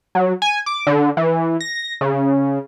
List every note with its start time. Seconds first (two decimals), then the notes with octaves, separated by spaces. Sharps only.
0.15 F#3
0.42 G#5
0.66 D6
0.87 D3
1.17 E3
1.61 A#6
2.01 C#3